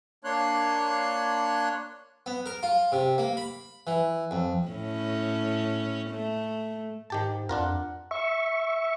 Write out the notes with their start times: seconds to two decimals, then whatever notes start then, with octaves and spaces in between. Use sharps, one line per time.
0.24 A#3 D4 C#5 C6 F#6
2.26 B3
2.46 A#4
2.63 F4
2.92 C3
3.18 A#3
3.37 B5
3.87 E3
4.31 F2
4.67 A2 C#4
6.10 A3
7.10 G#2 D#3 G4 A5
7.49 F2 D4 F4 A#4 F#5
8.11 E5 C#6